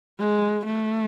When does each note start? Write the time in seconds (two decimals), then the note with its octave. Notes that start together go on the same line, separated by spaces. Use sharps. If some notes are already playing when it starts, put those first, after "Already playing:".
0.20 G#3
0.66 A3